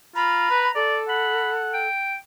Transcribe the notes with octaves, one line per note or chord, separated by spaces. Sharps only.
F4 A#5 B5
B4
A4 D5
F#5 B5
G5